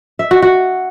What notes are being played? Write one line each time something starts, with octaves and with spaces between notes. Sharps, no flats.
E5
F#4
F#4